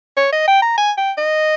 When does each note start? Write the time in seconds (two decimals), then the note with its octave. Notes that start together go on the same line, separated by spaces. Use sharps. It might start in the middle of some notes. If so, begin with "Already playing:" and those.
0.17 C#5
0.32 D#5
0.48 G5
0.62 A#5
0.78 G#5
0.97 G5
1.17 D#5